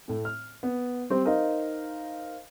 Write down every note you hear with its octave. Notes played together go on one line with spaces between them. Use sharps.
A2 A3
F6
B3
G3 C4 G4 C5
D#4 A#4 C5 D#5 F5